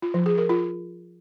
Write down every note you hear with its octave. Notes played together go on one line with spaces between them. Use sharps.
F4
F3
G#4
A#4
F4